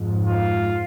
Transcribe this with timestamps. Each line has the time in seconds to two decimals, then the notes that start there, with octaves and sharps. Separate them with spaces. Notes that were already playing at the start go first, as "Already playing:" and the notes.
Already playing: F2 G#2
0.26 F4